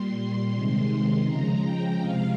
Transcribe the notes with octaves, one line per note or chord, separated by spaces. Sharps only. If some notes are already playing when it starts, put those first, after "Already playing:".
Already playing: A#2 G3 C6
C3 D#3 G#3
C#3 F3 G#3 A#5
G5
C3 F3 G#3 F5